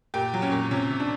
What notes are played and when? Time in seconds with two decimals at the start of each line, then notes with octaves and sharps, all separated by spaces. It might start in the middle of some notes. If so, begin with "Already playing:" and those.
0.14 A#2 G4
0.34 F#3
0.42 C#4
0.52 A#2
0.71 C3 C#4
0.90 C3
1.00 D4